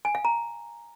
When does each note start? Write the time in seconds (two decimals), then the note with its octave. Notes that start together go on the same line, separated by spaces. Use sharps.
0.05 G#5
0.15 F5
0.25 A#5